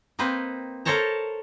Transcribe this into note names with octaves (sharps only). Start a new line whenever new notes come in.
A#3 C4 D#4 B4 C5
A4 A#4 C5 C#5 A5 A#5